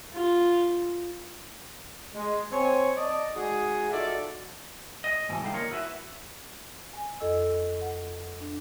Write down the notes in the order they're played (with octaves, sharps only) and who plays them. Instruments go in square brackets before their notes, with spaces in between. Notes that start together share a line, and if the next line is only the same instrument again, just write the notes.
[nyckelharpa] F4
[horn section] G#3
C4 C#5 G#5
D5 D#5 A5
G#3 D#4 F#4 G#4
D#4 F4 F#4 A4 D5 E5
[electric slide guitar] D#5
G#2 B2 E3
D3 G3 A3 D#4 F5
A#3 D#4 F4 A#4 C#5
E4 F#4 B4 D#5 E5
[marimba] G#5
F2 A4 D#5 E6
F#5
D4